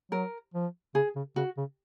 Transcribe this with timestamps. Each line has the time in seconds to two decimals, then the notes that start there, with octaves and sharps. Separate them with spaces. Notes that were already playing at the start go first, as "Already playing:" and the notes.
0.11 F#3 A#4
0.54 F3
0.94 C#3 G#4
1.16 C#3
1.36 C#3 F#4
1.57 C#3